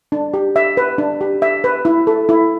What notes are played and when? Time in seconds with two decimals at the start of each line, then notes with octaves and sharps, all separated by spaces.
0.12 D4
0.34 G4
0.56 E5
0.77 B4
0.98 D4
1.21 G4
1.42 E5
1.64 B4
1.85 E4
2.07 A4
2.29 E4